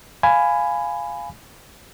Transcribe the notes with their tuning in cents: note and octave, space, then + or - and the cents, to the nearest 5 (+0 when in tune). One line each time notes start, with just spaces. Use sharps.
F5 +0 G#5 +0 B5 +15